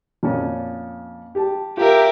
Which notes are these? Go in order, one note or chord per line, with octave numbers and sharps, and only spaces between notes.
F2 A#2 C#4
G4 A5
F4 G4 A#4 E5